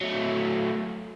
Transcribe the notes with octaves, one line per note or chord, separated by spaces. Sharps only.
F#3 A3